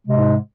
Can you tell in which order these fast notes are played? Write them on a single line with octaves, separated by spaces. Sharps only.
G#3 C3 G#2